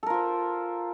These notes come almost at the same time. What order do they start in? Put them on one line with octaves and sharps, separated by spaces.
A4 A#4 F4 C5